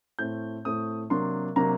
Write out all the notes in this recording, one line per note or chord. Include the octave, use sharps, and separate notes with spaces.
A2 A3 C4 G6
A2 A3 C4 D#6
C3 F#3 A#3 D4 C6
C3 F#3 A#3 D4 A#5